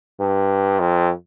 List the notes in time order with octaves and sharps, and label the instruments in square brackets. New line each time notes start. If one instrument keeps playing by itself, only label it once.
[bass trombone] G2
F2